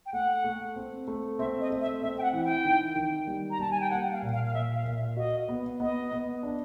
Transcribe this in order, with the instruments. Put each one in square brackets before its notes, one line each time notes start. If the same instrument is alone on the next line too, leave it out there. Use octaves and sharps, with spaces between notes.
[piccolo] G5
[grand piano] A3 [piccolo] F#5
[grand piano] A3
C4
A3
[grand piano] C4 [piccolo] E5
[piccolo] D#5
[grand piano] A3
[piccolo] E5
[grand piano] C4 [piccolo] E5
[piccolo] G5
F#5
[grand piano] E3
[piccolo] G5
[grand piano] D#3
D#3
G3
[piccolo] A#5
[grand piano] G3 [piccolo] A5
[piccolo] G#5
G5
[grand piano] A#3 [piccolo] F#5
[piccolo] F5
[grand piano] A#2
[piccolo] F5
F5
[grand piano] A#2 [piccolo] E5
[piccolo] F5
[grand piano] A#2
[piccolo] E5
[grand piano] F#4 [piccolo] D#5
[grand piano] B3
[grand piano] B3 [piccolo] D#5
[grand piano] B3
D4